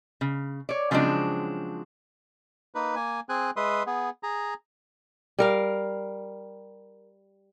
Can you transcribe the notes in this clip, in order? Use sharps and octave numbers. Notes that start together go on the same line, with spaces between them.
C#3
C#5 D5
C#3 F3 F#3 G#3 C4 D4
A#3 D#4 B4
A#3 G#5
C4 G#4 G#5 F#6
G#3 B4 E5 C6 D#6
B3 G#4
G#4 A#5
G3 A#4 F5